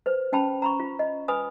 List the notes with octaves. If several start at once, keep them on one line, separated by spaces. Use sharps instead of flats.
B4 C5
C#4 G5 A5 B5
A#5 B5 C#6
F4
D#5
B4 G#5 B5 D#6